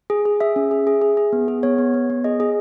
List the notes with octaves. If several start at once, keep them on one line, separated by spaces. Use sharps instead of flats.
G#4
G#4
G#4 E5
C#4
G#4
G#4
G#4
G#4
B3
G#4
B3 C#5
B3
B3
B3
G#4 D#5
G#4